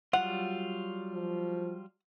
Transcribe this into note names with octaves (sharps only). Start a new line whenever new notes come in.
F#3 G3 F4 F#5
F3